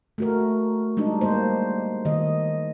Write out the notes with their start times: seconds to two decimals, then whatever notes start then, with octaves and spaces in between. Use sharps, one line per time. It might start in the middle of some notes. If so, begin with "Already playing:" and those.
0.18 A3 F#4 A#4
0.97 G3 G#3 D4 D#4
1.21 G3 G#3 A#3 C5
2.05 D#3 D#5